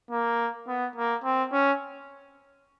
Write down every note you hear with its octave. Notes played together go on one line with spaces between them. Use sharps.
A#3
B3
A#3
C4
C#4